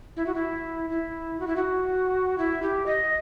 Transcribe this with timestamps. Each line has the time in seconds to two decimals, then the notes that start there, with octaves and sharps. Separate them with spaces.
0.16 E4
0.26 F#4
0.35 E4
0.90 E4
1.40 F#4
1.47 E4
1.56 F#4
2.38 E4
2.62 G4
2.86 D#5